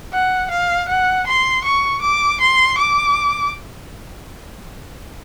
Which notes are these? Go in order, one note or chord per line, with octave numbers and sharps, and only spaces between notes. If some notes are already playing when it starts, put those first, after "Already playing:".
F#5
F5
F#5
C6
C#6
D6
C6
D6